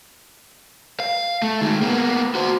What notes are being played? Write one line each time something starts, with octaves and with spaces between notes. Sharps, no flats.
F5
A3
D#3 G#3
A#3 B3
F#4 C5